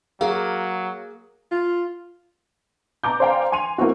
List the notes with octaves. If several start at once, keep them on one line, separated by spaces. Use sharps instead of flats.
F#3 A#3 G#4 F5
F4
A5 A#5 D6 G6
C5 D5 F5 G5 G#5 A#5
G#5 C6 D#7 F7
A#3 C4 E4 F#4